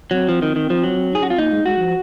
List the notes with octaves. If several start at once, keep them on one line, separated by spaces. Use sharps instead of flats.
F#3 C4
F3
D#3
D#3
F3
F#3
D#4 G#4
C#4 F#4
C4 F4
A#3 D#4
G#3
G#3 F#4
F3